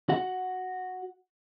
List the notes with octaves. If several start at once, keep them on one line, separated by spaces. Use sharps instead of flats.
F#4 F#5